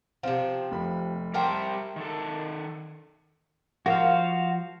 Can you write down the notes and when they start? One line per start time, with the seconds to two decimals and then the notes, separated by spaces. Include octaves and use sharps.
0.23 C3 F3 C4
0.71 F1 B5
1.34 G3 G4 A#4 C5 E5 G5 A5 C6
1.96 D#3 A4
3.86 F3 F4 F#4 A#4 C5 F5